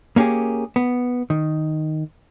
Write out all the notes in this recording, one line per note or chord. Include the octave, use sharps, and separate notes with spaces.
A#3 C#4 F4 G4 G#4
B3
D#3